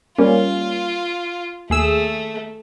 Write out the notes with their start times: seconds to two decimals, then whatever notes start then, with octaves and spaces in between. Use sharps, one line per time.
0.19 G3 A#3 C#4 F4
1.70 D#2 A3 G#4 E6